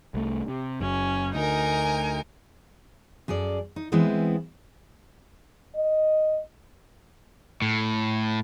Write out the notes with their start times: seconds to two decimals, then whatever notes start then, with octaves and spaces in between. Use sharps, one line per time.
0.14 C2 A3
0.48 C3
0.81 F#1 F#2 C#4
1.35 D2 D#4 A#4 G#5
3.28 F#2 G#4 A4 D5
3.76 D#4
3.92 E3 G#3 B3 C4 E4
5.75 D#5
7.62 A2